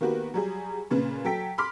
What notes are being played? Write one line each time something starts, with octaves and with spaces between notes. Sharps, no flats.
D#3 A#3 B3 F#4 G4 B4
F#3 G3 G#4
A#2 C#3 B4
F#3 A4 G5 B6
B5 C6 D6 F6 B6